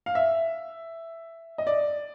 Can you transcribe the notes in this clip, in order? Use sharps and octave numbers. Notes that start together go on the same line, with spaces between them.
F5
E5
D#5
D5